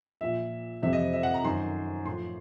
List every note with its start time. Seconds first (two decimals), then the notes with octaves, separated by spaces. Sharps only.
0.21 A#2 F3 E5
0.82 F2 C3 E3 E5
0.93 D#5
1.13 E5
1.23 F#5
1.34 A#5
1.44 F#2 D#3 C6
2.05 A2 F3 C6